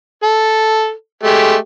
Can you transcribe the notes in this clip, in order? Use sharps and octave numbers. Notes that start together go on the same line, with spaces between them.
A4
G#3 A3 G4